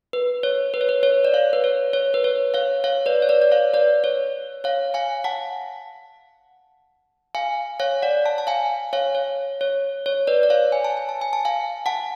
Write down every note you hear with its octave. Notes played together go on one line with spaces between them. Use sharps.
B4
C#5
B4
C#5
B4
C#5
D5
C#5 F5
B4
C#5
C#5
B4
C#5
C#5 F5
C#5 F5
B4 D5
C#5
B4 D5
D5
C#5 F5
B4 D5
C#5
C#5 F5
F5 G#5
F#5 A5
F5 G#5
C#5 F5
D5 F#5
F#5 A5
A5
F5 G#5
C#5 F5
C#5
C#5
C#5
B4 D5
D5
C#5 F5
G#5
A5
G#5
A5
G#5
A5
F5 G#5
F#5 A5